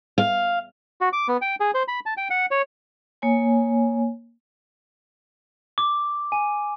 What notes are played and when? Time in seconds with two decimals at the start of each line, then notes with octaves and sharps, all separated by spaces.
0.18 F5
1.01 F#4
1.13 D6
1.28 B3
1.42 G5
1.60 G#4
1.74 C5
1.88 B5
2.06 A5
2.17 G5
2.30 F#5
2.51 C#5
3.22 A#3 C#5 G#5
5.78 D6
6.32 G#5